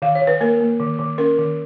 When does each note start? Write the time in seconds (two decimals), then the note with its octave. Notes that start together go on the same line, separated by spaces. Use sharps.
0.02 D#3 F5
0.15 C#5
0.22 D#3
0.27 B4
0.41 A#3 A#4
0.61 A#3
0.80 D#3
0.99 D#3
1.18 C#4 A#4
1.38 D#3